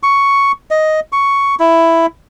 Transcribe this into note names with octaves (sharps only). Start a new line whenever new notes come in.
C#6
D#5
C#6
E4